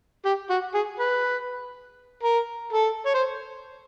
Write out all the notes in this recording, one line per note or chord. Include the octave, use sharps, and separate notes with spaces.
G4
F#4
G#4
B4
A#4
A4
C#5
C5